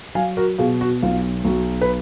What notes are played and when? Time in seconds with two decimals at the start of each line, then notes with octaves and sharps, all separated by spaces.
0.15 F#3 F5 G#5
0.37 F#4 A#4
0.58 B2 F4 G#4
0.81 F#4
1.03 B1 F4
1.44 B1 F#4
1.82 B4